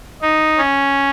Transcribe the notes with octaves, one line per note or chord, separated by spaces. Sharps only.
D#4
C#4